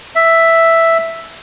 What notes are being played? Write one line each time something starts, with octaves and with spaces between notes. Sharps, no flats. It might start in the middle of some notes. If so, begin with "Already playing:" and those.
E5